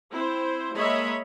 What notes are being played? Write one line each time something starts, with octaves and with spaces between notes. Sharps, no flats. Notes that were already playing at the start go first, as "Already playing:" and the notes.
C4 E4 C5
G#3 A#3 C#5 D#5 E5 B5